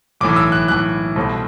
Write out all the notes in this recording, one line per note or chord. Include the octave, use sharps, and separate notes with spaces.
B1 A2 E3 D6
E6
F#6
B1 A2 E3 F#6
C2 B2 A3 C4